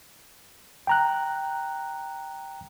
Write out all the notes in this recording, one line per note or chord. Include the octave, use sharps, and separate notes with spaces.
G5 A#5 F#6